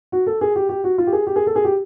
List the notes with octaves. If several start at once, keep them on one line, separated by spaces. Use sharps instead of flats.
F#4
A4
G#4
G4
G4
F#4
F4
G4
G#4
G4
G#4
A4
G#4
G4